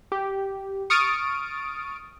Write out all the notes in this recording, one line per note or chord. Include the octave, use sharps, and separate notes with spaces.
G4
C#6 D#6 F6 A6 D7